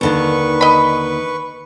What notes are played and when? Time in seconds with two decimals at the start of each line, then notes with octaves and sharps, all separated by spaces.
0.01 D#2 D3 D#3 B4 C#6
0.61 D#5 B5